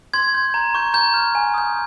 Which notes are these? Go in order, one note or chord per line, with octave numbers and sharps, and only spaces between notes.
C6 G#6
G6
A#5
C#6 G6
A#5 G6
F6
G#5
D#6 G6